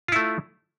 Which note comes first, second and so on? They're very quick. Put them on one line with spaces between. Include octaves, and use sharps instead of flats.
F4 E4 A3